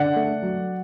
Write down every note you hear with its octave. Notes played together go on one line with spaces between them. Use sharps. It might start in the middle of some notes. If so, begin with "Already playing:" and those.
Already playing: D3 D5 F#5
A3
F#3